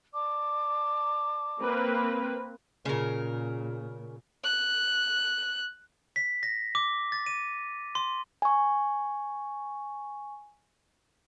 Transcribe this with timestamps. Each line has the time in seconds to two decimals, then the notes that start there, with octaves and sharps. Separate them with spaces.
0.13 D5 A5 D6
1.61 A#3 C4 B4
2.85 A#2 C#3 A#4
4.44 F#6
6.16 B6
6.43 A#6
6.75 D6
7.12 A6
7.26 D#7
7.95 C6
8.42 G#5 C#6